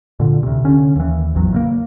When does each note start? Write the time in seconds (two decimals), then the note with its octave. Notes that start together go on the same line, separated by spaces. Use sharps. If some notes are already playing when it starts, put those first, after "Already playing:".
0.20 A#2 D3
0.43 D2 C3
0.64 D3 C#4
0.96 D#2 E3
1.35 G#1 E2 F#3
1.53 C#3 A3 A#3